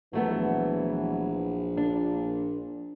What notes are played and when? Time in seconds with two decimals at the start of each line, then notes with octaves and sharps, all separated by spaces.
0.13 A#1 E3 F#3 A3 B3
1.77 A#2 D4